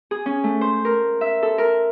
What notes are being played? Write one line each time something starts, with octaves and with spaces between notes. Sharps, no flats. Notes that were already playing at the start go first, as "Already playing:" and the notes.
G#4
C#4
A3
C5
A#4
E5
A4
A#4